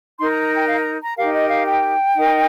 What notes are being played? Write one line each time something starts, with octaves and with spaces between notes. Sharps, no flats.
D#4 A#4 C6
A#5
A#5
G5
F5
A#5
A#5
D#4 G4 A#4 F5
D#5
F5
G5
D#4 A#4